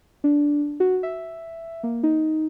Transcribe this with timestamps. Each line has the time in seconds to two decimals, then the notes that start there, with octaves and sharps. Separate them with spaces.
0.24 D4
0.80 F#4
1.03 E5
1.83 A#3
2.03 D#4